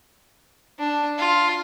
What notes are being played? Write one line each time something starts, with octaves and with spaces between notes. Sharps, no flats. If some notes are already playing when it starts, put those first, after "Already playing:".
D4
F4